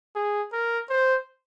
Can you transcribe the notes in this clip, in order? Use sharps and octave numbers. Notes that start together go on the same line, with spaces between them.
G#4
A#4
C5